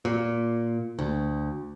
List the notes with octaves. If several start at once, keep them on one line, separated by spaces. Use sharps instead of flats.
A#2
D2